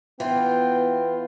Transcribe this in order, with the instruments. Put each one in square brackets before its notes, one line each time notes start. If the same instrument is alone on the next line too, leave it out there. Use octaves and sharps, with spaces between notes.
[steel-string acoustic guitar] E3 F4 [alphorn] B3 [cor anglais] G5